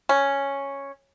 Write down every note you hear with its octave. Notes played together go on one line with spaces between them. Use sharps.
C#4